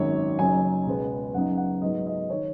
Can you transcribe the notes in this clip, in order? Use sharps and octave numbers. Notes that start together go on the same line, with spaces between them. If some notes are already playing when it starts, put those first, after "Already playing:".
Already playing: G#1 F#2 D#3 F#3 C#5
F#1 F#2 F#3 D#4 G#5
C#2 B2 G#3 B3
F#1 F#2 C#3 B3 D#4 F#5
F#5
G#2 F#3 B3 D#5
D#5
D#3 C#5